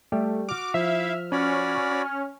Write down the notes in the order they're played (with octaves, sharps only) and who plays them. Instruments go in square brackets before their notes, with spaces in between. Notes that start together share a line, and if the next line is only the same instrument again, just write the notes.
[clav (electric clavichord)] G3 G4 [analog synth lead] A3
[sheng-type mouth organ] F#4 [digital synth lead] D6 [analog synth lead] F6
[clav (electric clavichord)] F3 [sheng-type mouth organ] E4 F5 [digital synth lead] E5
[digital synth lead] C#4 [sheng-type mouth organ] F#4 D5 B5
[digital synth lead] C#4